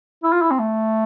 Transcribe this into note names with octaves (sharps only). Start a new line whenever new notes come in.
E4
F4
E4
C4
A3